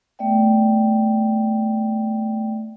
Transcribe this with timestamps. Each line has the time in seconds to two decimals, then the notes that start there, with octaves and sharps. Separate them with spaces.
0.19 A3 B3 D5 E5 G5